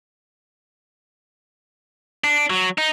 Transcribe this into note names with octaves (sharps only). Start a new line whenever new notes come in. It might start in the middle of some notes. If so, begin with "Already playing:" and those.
D4
F#3
D#4